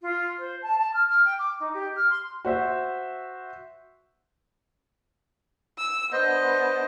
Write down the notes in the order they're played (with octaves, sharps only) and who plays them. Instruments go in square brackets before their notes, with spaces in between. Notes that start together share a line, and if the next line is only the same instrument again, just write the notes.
[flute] F4
C5
A5
A5
F6
F6
G5
D6
D#4
G4
F6
C6
[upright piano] F#4 C5 E5
[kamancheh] E6
[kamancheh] B3 D4 [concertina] C5 D#5